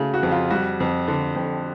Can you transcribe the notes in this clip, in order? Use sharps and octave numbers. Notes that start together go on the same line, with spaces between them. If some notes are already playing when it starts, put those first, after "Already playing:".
Already playing: C#3 F#3 A3
F#4
F2
F4
G3 F#4
F2
D3
F2